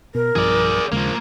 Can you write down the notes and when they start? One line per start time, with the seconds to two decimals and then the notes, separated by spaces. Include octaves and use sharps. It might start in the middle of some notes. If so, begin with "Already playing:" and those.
0.15 B2 A#4
0.36 B1 G2 F3 G#4 D5
0.92 D#2 C#3 F3 G#3 A#3